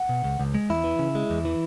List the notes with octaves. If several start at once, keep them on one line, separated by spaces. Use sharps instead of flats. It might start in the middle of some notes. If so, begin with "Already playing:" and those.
Already playing: F#5
B2
C#2
C#2
G#3
E2 E4
E3
C#3
G#3
E2
E3